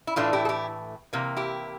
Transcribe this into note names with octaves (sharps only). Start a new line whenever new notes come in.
E4
A2 E3 A3 D4 F4
E4 G4
A4
E4 G4
C3 E3 A#3
E4 G4